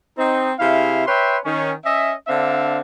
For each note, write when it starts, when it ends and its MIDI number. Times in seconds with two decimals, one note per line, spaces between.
0.18 0.51 60
0.18 0.51 63
0.59 1.02 48
0.59 1.02 64
0.59 1.02 68
0.59 1.02 77
1.07 1.37 71
1.07 1.37 73
1.07 1.37 76
1.07 1.37 79
1.07 1.37 84
1.44 1.72 51
1.44 1.72 61
1.85 2.12 61
1.85 2.12 75
1.85 2.12 76
2.28 2.79 50
2.28 2.79 60
2.28 2.79 62
2.28 2.79 76
2.28 2.79 77